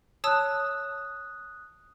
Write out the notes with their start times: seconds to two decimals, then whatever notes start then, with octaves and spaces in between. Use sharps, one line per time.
0.24 C#5 A5 D#6 E6 F#6